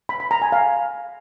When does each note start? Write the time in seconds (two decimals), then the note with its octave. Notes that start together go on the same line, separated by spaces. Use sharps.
0.09 B5
0.20 B5
0.31 A#5
0.42 G#5
0.52 F5